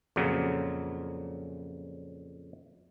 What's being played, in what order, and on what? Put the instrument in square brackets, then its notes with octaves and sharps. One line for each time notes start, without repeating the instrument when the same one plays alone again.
[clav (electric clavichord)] F2 A#2 C#3 F#3